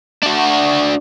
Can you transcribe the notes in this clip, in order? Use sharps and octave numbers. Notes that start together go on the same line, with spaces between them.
D4 F#4